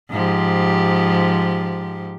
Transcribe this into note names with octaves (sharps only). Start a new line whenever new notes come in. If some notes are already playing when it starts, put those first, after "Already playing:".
G#2 F3 G4